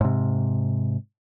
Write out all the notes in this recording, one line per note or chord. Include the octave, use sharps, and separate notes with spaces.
G#2 C3